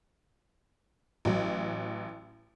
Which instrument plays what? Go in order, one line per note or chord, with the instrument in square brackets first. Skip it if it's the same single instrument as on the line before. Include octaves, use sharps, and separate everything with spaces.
[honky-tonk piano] A1 F#3